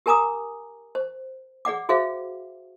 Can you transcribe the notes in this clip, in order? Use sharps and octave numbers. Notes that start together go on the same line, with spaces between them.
G4 A#4 G#5 A#5 D6 D#6
C5
G#4 D5 F#5 D6
F#4 G#4 C5 E5 F5